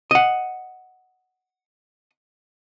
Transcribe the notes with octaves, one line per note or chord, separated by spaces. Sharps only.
D#5 F#5